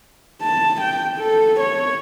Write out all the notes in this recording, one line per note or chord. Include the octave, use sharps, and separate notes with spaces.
A5
G5
A4
C#5